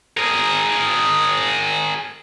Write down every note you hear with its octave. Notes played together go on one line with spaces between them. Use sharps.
G#4 A#4